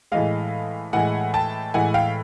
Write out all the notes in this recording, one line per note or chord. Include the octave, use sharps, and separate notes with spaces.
A2 E3 G#3 D#5 F5
A2 E3 G#3 F#5 G#5
G5 A5
A2 E3 G#3 F#5 G#5
F5 G5